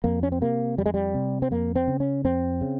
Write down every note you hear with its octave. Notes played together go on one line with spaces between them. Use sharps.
F2 A#3
C#4
C4
C3 A#3
F2 G3
G#3
G3
C3
C4
F2 A#3
C4
C#3
C#4
F2 C4
C#3